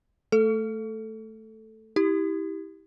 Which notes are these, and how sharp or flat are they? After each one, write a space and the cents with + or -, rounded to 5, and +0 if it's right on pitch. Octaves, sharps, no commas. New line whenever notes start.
A3 +0 A4 +0
E4 -30 G4 +0